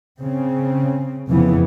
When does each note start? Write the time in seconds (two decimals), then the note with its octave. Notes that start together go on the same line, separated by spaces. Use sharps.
0.19 C#3 C4
1.29 F1 F2 C#3 E3 F3 B3